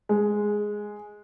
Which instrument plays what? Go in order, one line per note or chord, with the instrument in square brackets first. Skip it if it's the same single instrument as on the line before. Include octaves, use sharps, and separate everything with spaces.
[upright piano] G#3